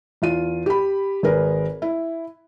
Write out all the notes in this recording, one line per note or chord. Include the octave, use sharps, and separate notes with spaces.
E2 F4 D#7
G4 B5
G#1 G#4 A#4 B4
E4